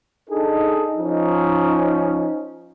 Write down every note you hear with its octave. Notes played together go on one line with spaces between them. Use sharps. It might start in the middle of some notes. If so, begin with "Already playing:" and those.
D4 D#4 G#4 A4
F3 C#4 D#4